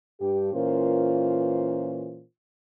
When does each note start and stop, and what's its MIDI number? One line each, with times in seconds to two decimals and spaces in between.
0.20 0.51 43
0.20 0.51 67
0.53 2.22 46
0.53 2.22 52
0.53 2.22 61
0.53 2.22 65
0.53 2.22 70
0.53 2.22 72